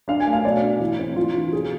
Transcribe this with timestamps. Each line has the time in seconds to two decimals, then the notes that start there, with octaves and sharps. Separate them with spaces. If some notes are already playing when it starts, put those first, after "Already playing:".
0.08 D4 F5
0.20 G#5
0.26 A3
0.33 F5
0.44 B2 D5
0.62 D4
0.80 E3 E4
0.99 C4
1.16 E3 F4
1.35 D4
1.52 B2 G#4